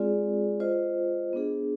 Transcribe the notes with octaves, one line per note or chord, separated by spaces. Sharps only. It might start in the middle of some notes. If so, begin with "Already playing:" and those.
Already playing: G#3 C4 F4 G#4 D5
F4 C5 D#5
B3 D4 G#4